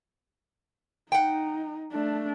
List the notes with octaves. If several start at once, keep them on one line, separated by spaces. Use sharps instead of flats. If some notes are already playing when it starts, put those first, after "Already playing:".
D#4 F#5 G5
A3 D4